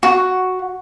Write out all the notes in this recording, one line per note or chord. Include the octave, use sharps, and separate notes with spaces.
F#4